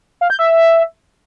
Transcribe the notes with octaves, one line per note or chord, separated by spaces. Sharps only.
F5
G6
E5